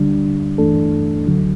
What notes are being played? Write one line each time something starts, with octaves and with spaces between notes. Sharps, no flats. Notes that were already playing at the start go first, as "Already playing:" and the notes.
Already playing: D2 D3 G3 D4
G2 E3 A3 D4 A4
D2 D3 F#3